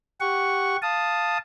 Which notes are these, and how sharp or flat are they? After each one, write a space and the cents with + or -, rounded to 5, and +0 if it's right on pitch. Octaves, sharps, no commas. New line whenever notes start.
G4 +0 F#5 +0 C#6 +0
F5 +0 A5 +0 D#6 -5